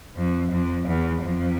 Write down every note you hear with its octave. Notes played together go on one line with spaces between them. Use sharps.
F2
F2
E2
F2